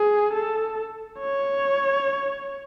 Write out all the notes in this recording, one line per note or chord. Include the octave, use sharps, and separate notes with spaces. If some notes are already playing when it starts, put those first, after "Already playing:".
Already playing: G#4
A4
C#5